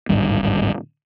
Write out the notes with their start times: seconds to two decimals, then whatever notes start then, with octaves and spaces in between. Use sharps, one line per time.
0.09 D1 G#1 G2